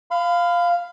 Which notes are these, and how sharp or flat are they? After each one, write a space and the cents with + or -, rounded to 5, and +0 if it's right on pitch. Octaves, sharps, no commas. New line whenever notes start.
F5 +0 B5 +35